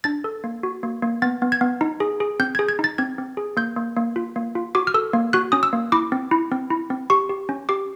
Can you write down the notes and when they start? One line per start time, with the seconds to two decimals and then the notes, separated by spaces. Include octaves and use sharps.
0.04 D4 A6
0.24 A4
0.44 A#3
0.63 F#4
0.83 A#3
1.02 A#3
1.22 B3 A6
1.42 B3
1.52 G#6
1.61 B3
1.81 D#4
2.00 G#4
2.20 G#4
2.40 C4 G6
2.55 G#4 G#6
2.69 G#6
2.79 D#4
2.84 A6
2.98 C4 G#6
3.18 C4
3.37 G#4
3.57 A#3 G6
3.77 A#3
3.97 A#3
4.16 F4
4.36 A#3
4.55 F4
4.75 F#4 D6
4.87 F6
4.94 A4 E6
5.13 A#3
5.33 F#4 F#6
5.52 C#4 D#6
5.63 E6
5.73 A#3
5.92 E4 D6
6.12 C4
6.31 E4
6.52 C4
6.70 E4
6.90 C4
7.10 G4 C#6
7.30 G4
7.49 C#4
7.69 G4 D6